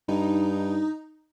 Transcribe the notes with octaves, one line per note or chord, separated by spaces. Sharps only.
G2 D#4